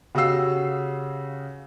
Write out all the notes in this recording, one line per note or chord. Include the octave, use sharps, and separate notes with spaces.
C#3 F#4 G4 F5 E6 C7